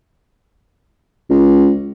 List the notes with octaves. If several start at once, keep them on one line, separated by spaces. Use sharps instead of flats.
C#2